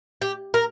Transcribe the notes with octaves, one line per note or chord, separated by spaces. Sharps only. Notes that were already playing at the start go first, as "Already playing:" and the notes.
G4
A#4